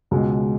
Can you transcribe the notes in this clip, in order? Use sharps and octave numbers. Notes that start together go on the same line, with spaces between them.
C#2 B2 G#3